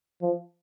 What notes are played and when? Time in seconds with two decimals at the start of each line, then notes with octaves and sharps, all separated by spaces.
0.22 F3